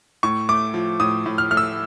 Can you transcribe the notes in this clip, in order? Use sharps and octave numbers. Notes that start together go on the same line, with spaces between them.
A2 C#6
A3 D6
F3
A2 D#6
A2
F6
A3 F6
E6